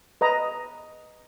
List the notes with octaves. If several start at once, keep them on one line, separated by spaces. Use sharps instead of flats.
B4 D#5 A#5